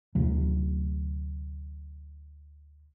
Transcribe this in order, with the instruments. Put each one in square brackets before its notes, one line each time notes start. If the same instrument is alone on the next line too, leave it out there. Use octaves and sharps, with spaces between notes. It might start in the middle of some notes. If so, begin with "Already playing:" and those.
[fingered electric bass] D2 C3 F#3